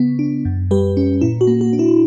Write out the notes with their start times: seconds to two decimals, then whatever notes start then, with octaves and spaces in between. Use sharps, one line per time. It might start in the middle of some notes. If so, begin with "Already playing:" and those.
Already playing: C#3 B3
0.19 D4
0.45 F#2
0.71 G3 G4 B4
0.97 C#4
1.21 A#2 E4
1.41 F#4
1.47 A#3
1.61 F#4
1.73 D4
1.79 E4